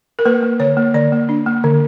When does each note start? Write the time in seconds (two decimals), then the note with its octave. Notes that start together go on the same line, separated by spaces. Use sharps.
0.19 A#4
0.25 A#3 B4
0.43 A#3
0.60 D3 C#5
0.77 A#3
0.94 D3 D5
1.12 A#3
1.29 D4
1.46 A#3
1.64 D3